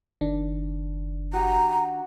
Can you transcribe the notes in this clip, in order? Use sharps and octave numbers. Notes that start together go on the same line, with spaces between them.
F#1 D#3 D4
F#4 G4 A#5